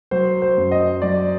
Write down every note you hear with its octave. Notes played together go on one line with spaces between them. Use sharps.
F#3 C5
C5
F#2
D#5
F#3 D5